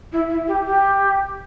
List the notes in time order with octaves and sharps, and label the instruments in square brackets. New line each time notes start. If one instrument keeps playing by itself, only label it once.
[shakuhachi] E4
E4
G4
G4